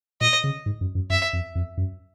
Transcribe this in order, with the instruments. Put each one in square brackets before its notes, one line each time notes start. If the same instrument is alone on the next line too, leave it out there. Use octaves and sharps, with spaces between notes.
[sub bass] A#2 [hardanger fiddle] D#5
[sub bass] C#3
G#2
F#2
F#2
[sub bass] F#2 [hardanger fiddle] E5
[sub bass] F2
F2
F#2